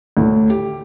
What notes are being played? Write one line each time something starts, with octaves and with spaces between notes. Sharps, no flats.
D2 A2
G4